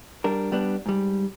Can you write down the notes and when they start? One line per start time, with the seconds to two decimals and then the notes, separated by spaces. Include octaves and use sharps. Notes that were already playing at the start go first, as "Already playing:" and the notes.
0.24 G3 D4 A#4
0.52 G3 B3 D4
0.86 G#2 G3